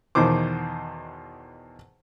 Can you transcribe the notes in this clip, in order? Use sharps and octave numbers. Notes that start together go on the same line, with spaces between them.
E2 B2 D#3 C5 D6